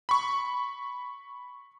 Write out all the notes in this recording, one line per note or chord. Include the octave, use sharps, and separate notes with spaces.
B5 C#6